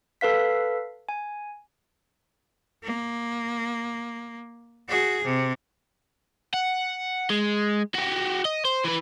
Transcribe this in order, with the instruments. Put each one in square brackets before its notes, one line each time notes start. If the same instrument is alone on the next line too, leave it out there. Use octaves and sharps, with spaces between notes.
[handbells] A4 B4 F5 B6
G#5
[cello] A#3
F#4 G#4
C3
[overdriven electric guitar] F#5
G#3
F#4 G4
D#5
C5
E3 B4